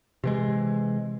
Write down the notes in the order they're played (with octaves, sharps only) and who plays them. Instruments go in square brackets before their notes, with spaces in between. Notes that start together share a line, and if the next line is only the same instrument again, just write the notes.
[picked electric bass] C3 E3 G#3